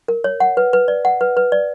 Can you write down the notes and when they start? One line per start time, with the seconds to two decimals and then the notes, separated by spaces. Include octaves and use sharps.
0.08 A#4
0.24 C#5
0.40 F#5
0.57 B4
0.73 B4
0.88 D5
1.05 F#5
1.21 B4
1.37 B4
1.52 D5